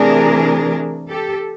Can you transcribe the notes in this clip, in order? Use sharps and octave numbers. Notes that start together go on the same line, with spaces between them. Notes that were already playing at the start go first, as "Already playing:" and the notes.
Already playing: C3 E3 A3 D4 G#4 A#4
G4 A4